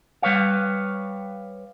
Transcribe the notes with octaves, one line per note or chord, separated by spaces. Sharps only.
G3 B4 C#5 F5